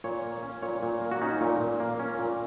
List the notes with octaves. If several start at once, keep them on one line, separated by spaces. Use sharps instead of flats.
A#2 C#5
A#3
C#4
A#2 C#5
A#2
A#3
F#4
C#4 D#4
A#2
A#2
A#3
C#4
A#2